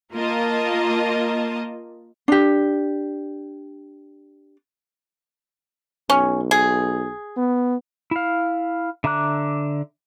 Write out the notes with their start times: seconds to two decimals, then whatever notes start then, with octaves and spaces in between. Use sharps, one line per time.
0.14 A#3 F4 A#4 D#5 A5
2.28 D4 G4
6.10 B1 C#4
6.51 G#4
7.37 B3
8.11 E4 F5
9.04 D3 E5 A#5 D6 F#6